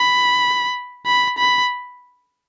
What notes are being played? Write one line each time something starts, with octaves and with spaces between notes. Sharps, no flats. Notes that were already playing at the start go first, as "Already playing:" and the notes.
Already playing: B5
B5
B5